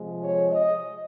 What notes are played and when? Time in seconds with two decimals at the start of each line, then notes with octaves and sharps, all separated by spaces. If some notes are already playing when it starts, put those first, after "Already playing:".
Already playing: C3 F3 G#3
0.23 C#5
0.52 D#5